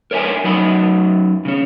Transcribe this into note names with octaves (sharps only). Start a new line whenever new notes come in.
A#4 C#5 D5 E5 G#5
F#2 F#3 D#4 F#5 B5
C#3 C#4